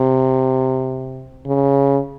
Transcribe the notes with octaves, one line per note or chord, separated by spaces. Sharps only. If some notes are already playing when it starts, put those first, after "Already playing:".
Already playing: C3
C#3